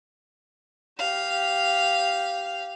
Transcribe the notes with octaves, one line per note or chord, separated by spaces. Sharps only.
G4 F5